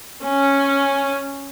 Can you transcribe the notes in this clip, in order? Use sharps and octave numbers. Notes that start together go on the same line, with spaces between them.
C#4